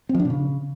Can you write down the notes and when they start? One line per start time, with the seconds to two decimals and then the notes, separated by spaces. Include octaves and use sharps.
0.09 C4
0.15 F3
0.20 D4
0.25 B2
0.30 C#3